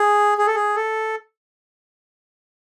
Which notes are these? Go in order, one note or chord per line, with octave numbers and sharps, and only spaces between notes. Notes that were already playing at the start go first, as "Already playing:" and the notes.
Already playing: G#4
G#4
A4
G#4
A4